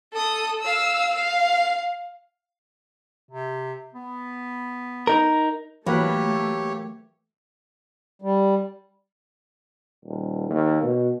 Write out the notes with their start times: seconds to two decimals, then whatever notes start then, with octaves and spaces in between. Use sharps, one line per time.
0.13 A4 D#6
0.61 F5 E6
1.16 F5
3.29 C3
3.94 B3
5.07 D#4 A#4
5.86 E3 F#3 A3 A#3 G4 B4 C#5
8.22 G3
10.05 D#1
10.49 D#2
10.83 B2